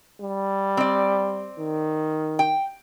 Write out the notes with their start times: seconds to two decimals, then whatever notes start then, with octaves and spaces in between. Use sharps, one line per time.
0.20 G3
0.77 C4 D5
1.58 D#3
2.39 G5